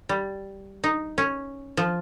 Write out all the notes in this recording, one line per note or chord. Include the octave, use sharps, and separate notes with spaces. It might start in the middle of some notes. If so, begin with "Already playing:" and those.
G3
D#4
C#4
F3